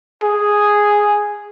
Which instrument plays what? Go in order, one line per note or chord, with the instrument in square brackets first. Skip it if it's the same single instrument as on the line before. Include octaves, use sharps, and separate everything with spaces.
[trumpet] G#4